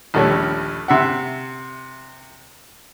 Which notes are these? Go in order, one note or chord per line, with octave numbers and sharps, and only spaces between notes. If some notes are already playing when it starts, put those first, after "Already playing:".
A#1 D#2 G3 A3 C#4
C3 E5 F#5